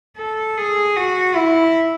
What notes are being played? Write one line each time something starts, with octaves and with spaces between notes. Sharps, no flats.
A4
G#4
F#4
E4